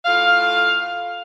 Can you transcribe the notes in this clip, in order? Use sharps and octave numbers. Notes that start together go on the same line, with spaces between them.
A2 F4 F5